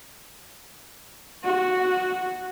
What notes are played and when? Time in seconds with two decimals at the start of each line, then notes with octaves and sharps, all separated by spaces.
1.44 F#4